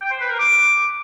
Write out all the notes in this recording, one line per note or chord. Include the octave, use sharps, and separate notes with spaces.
G5
C5
B4
A#4
D6